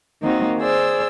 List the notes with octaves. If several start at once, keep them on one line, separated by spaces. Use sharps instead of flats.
D#3 A#3 C4 D#4 F#4
G#4 C5 D5 E6